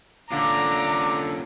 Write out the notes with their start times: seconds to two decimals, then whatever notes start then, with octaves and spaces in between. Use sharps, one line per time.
0.32 D3 A#3 C#4 F4 A#5 D6